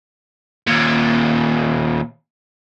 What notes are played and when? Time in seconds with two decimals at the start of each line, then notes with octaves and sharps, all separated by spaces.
0.67 D#2 A#2